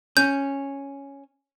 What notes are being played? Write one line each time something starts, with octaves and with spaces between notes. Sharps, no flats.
C#4 G6